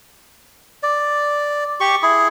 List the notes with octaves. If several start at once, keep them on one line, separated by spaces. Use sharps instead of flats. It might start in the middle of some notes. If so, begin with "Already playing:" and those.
D5
G4 C#6
E4 G#4